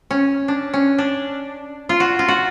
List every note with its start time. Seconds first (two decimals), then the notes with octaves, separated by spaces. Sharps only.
0.11 C#4
0.48 D4
0.73 C#4
0.98 D4
1.89 F4
2.00 F#4
2.19 F4
2.28 F#4